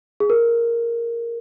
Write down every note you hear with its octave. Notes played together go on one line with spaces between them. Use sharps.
G#4
A#4